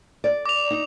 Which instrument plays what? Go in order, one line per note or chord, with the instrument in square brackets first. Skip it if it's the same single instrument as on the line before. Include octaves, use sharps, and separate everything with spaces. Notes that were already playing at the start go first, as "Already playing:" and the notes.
[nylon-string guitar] D5
[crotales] D6 F7
[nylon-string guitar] D#4